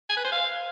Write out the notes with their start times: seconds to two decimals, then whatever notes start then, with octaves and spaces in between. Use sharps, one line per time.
0.09 G#5
0.17 B4
0.24 C5
0.32 F5